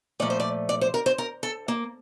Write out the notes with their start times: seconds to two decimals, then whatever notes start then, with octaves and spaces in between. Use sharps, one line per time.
0.20 A#2 F3 A3 D5
0.30 C5
0.40 D5
0.69 D5
0.81 C5
0.94 A#4
1.06 C5
1.18 A#4
1.43 A4
1.68 A#3